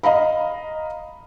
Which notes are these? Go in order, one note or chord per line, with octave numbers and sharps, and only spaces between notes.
D#5 F5 A#5 B5